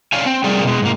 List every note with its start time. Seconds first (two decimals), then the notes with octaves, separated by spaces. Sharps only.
0.13 C#5 D5 F5 G#5
0.26 C4
0.44 G3 C4 G#4 A#4 D5
0.64 B2 G#3
0.82 G#2 A#3